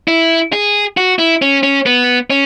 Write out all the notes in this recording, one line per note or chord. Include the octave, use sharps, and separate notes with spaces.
E4
G#4
F#4
E4
C#4
C#4
B3
C#4